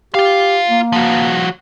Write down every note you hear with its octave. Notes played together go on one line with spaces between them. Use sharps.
F4 G4 F5
A#3
F3 F#4